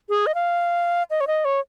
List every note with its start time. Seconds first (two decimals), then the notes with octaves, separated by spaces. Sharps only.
0.09 G#4
0.26 D#5
0.35 F5
1.11 D#5
1.21 C#5
1.27 D#5
1.45 C#5